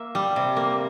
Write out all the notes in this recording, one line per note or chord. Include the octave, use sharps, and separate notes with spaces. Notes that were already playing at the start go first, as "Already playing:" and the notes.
Already playing: A#3 E5
G3
C3
A#3